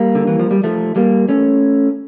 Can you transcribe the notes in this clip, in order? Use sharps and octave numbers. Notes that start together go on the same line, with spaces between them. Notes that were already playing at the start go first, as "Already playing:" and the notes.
Already playing: G3 A#3
D3
E3
F3
G3
F3 A3
G3 A#3
A3 C#4